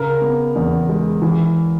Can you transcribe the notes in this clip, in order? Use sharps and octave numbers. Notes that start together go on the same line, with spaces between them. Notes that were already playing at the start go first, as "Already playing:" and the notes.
Already playing: C#3 A#4
B3
E2
G#3
E3